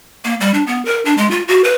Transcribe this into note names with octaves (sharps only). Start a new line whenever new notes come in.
A#3
G3
D4
B3
A#4
D4
G#3
F4
F#4
B4